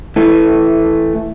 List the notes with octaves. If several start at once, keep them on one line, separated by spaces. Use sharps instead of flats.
E3 A3